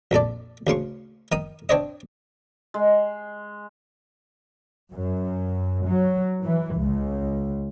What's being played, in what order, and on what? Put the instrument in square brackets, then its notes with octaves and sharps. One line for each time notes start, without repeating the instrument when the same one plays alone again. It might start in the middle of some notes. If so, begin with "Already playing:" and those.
[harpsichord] A#1 F2 A4 D5
D2 C#3 C6 C#6
D#3 D#4 D#6
C4 D4 C5 C#5 D#5
[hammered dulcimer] G#3
[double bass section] F#2
F#3
E3
C#2